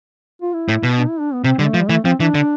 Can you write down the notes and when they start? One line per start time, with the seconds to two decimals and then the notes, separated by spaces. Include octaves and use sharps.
0.42 F4
0.53 E4
0.68 A2
0.83 B2
0.98 D4
1.09 E4
1.20 D4
1.34 B3
1.44 C3 C4
1.59 D3 G3
1.67 A3
1.74 F3
1.81 G3
1.89 E3 A3
2.05 F3 C4
2.20 E3 D4
2.35 D3